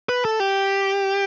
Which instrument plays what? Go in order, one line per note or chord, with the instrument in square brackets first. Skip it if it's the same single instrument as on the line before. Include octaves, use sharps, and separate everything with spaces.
[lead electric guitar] B4
A4
G4